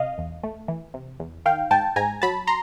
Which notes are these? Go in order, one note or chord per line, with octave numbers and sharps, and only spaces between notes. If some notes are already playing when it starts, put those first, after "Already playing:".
Already playing: C3 D#5 F5
E2
A3
E3
C3
E2
D#3 F5 G5
G#2 G5 A5
G#2 G#5 A#5
F#3 A5 B5
A#5 C6